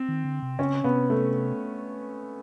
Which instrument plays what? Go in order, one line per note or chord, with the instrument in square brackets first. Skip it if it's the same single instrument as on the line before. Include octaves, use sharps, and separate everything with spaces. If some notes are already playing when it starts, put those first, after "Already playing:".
Already playing: [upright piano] C4
[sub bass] D#3
D3
C3
[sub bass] C#3 [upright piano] C#4
[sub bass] C3 [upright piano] B3
[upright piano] A3